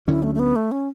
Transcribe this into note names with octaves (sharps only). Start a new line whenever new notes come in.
D2 D3 F#3 C#4 E4
A3
A3
B3
A3
C#4